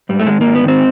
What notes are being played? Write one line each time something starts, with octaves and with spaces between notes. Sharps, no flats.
G#2 G3
A3
D#3 G#3
G#2 A#3
B3
D#3 C4